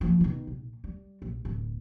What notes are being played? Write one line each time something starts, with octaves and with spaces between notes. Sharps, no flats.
F3 A#3
B2 D#3
A#1
G3
A#1
D1